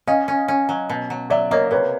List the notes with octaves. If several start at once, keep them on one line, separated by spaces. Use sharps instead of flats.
C#4 D#5 F5
C#4
C#4
F#3
B2
F#3
F#3 D5 E5
A#3 C#5 D#5
C3 B4 C#5